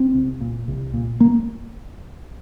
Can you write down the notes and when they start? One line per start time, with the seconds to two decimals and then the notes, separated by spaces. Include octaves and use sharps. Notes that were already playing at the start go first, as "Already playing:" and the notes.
Already playing: C4
0.15 C2
0.41 A#2
0.68 C2
0.94 A#2
1.20 A#3